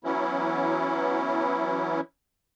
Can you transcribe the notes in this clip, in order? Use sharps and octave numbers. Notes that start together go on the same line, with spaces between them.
E3 F#3 B3 C#4 E4